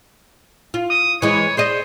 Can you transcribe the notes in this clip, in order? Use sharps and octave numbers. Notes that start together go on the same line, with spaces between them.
F4
D#6
E3 G#3 E4 C#5
G#4 C5 D5 D#5